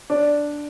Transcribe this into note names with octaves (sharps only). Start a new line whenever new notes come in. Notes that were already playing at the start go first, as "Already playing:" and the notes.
D4